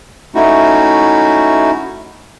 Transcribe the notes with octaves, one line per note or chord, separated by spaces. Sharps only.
A3 C#4 D#4 E4 F#4